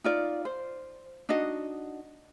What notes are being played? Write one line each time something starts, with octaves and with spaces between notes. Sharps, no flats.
D#4 F4 D5
C5
D4 D#4 F#4 D#5